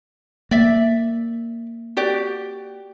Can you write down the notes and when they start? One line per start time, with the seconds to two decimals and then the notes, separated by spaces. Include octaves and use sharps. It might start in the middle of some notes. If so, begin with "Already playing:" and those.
0.51 A#3 D5 E5
1.97 F#4 G4 D5